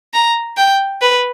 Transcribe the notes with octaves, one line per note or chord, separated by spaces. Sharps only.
A#5
G5
B4